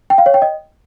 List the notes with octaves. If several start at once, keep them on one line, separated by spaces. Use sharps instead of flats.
G5
F5
C#5
G5
D#5